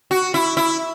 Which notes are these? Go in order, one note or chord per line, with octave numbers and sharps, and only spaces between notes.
F#4
E4
E4